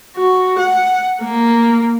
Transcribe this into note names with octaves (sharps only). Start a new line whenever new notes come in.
F#4
F#5
A#3